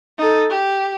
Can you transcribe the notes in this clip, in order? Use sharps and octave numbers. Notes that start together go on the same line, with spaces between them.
D#4 A4
G4